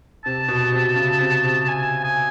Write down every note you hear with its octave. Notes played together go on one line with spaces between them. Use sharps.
C3 A5
B2
C3
C#3
C3
C3
G#5
G#5